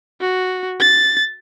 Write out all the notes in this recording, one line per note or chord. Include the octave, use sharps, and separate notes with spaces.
F#4
A6